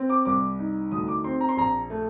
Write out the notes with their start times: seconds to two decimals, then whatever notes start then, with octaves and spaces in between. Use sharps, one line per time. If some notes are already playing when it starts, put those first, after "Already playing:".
Already playing: C4
0.09 D6
0.25 C2 D6
0.59 D#4
0.91 D2 D#6
1.08 D6
1.24 C4 C6
1.41 A#5
1.49 C6
1.57 A#1 A#5
1.90 A3